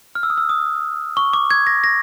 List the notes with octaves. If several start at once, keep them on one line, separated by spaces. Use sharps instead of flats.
F6
E6
D#6
E6
D#6
C#6
D6
G#6
A#6
A#6